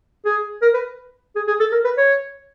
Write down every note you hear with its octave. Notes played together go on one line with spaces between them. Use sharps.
G#4
A#4
B4
G#4
G#4
A4
A#4
B4
C#5